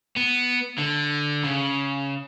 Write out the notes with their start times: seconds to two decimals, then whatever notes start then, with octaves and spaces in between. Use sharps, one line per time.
0.16 B3
0.78 D3
1.44 C#3